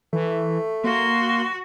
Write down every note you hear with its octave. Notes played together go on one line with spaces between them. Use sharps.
E3 A3
A#3 F#4 C6